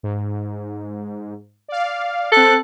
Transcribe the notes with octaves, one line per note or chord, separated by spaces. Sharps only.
G#2
D5 F5
C4 A4 F#6